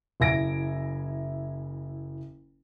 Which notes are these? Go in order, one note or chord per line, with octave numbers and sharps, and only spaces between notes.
F#1 E4 G#5 A#6 D7